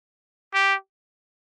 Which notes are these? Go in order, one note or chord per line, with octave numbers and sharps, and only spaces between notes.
G4